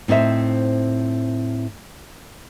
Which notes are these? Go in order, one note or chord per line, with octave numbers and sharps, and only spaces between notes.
A2 C4 D#4 C5 E5